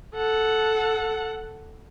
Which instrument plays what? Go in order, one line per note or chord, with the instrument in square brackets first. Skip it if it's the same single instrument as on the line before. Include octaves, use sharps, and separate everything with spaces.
[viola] A4 F#5